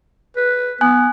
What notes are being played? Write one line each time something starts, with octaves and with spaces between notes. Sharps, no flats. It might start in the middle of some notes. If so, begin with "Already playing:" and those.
B4
B3 G#5 F#6